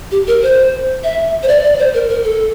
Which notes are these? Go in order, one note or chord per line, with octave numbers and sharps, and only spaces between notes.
G4
A#4
C5
E5
C5
D5
D5
C5
A#4
A#4
A4